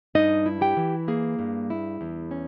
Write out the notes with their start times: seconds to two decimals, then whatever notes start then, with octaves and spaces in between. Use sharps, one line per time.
0.15 G2 D#4 D#5
0.46 E4
0.61 G4 G5
0.77 E3
1.08 A#3 G#4
1.39 G2
1.70 E4
2.01 E2
2.31 C#4